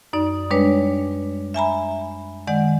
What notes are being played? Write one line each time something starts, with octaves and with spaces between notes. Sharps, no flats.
F#2 D#4 D5
G3 G#3 D4 B4 C#5
E5 G#5 A#5 B5
D#3 G#3 D5 F#5